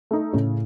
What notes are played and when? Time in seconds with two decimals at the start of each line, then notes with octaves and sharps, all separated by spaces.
0.11 A3 D#4
0.33 A2 C#3